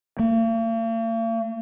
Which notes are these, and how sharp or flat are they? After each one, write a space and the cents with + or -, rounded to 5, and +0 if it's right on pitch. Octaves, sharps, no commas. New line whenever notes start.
A#3 -45